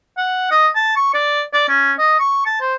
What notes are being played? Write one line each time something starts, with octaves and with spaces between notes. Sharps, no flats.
F#5
D#5
A5
C#6
D5
D5
C#4
D#5
C#6
A5
C5